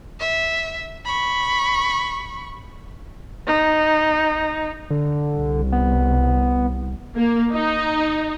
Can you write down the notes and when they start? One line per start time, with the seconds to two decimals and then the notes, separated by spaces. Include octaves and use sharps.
0.20 E5
1.05 B5 C#6
3.47 D#4
4.91 D3
5.35 C2
5.72 B3
7.15 A#3
7.51 D#4